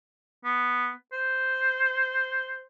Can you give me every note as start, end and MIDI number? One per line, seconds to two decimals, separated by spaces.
0.45 0.91 59
1.13 2.64 72